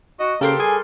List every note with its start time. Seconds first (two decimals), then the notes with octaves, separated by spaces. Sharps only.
0.20 F#4 D#5
0.41 C#3 A#3 G4 A4 A#4 C5
0.60 G3 G#4 G#5